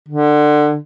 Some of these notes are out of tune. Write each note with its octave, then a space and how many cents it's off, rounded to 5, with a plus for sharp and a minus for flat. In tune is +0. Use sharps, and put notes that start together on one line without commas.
D3 +20